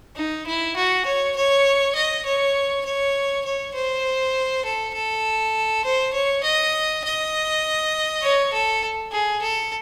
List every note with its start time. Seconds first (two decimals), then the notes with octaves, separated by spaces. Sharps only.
0.16 D#4
0.47 E4
0.76 F#4
1.06 C#5
1.36 C#5
1.95 D#5
2.25 C#5
2.85 C#5
3.45 C#5
3.75 C5
4.65 A4
4.94 A4
5.85 C5
6.13 C#5
6.44 D#5
7.04 D#5
8.22 C#5
8.53 A4
9.12 G#4
9.42 A4